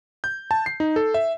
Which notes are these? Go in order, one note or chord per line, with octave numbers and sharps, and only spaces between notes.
G6
A5
C7
D#4
A4
E5